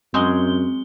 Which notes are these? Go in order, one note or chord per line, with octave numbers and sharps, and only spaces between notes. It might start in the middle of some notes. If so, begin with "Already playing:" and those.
F#2 F#3 G#3 C4 G#4 G7